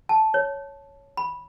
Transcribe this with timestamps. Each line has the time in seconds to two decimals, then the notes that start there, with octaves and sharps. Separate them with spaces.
0.09 A5
0.34 C#5
1.17 B5